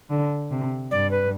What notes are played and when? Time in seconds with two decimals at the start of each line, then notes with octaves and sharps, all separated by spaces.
0.10 D3
0.50 C3
0.91 G2 D5
1.11 B4